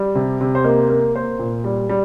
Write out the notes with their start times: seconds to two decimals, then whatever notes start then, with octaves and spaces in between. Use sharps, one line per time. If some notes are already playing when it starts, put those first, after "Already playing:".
Already playing: G3
0.15 C3
0.41 C3
0.55 C5
0.64 A#3 D#5
0.90 A#3
1.15 A#3 C5
1.39 A#2
1.64 G3
1.89 G3